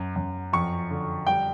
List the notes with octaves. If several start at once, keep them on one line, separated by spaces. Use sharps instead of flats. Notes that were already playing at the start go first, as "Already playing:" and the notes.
Already playing: F#2
F#2
F2 C#6
D3
G3 G5